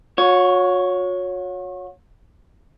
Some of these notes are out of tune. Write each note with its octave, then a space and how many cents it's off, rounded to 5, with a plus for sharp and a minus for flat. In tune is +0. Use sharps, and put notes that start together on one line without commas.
F#4 -40 C#5 +0